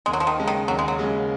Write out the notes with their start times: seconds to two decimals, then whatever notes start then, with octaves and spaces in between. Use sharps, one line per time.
0.06 D#2 G#3
0.13 F#3
0.20 F3
0.27 D#3
0.38 C#3 G#3
0.47 D#3
0.68 D#2 F#3
0.79 G#3
0.88 F#3
0.99 C#3 G#3